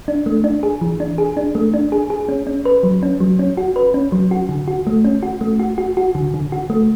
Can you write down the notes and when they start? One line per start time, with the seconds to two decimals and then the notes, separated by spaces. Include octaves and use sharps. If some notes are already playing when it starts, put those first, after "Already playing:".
0.08 D4
0.26 A3
0.44 D4
0.63 G#4
0.81 E3
1.00 D4
1.18 G#4
1.37 D4
1.55 A3
1.74 D4
1.92 G#4
2.10 G#4
2.29 C#4
2.47 C#4
2.65 B4
2.83 F#3
3.03 C#4
3.20 F#3
3.39 C#4
3.57 F#4
3.76 B4
3.94 C#4
4.12 F#3
4.31 F#4
4.49 D3
4.68 F#4
4.87 A3
5.04 C#4
5.23 F#4
5.41 A3
5.59 F#4
5.78 F#4
5.97 F#4
6.15 D3
6.34 D3
6.52 F#4
6.70 A3